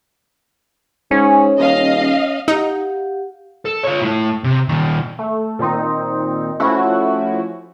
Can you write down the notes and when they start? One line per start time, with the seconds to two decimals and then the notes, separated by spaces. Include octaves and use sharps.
1.11 G#2 C#4
1.58 D#1 D#5 F5
2.48 D#4 G4 F5 F#5
3.65 A4
3.83 F4 C#5
4.01 A2 A3
4.44 C3
4.68 A#2 D#3
5.19 A3
5.59 A#2 D#3 C4 D#4
6.60 F3 A3 C#4 E4 F#4